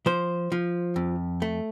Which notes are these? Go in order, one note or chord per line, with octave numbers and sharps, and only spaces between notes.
F3 C5
F3
F2
A3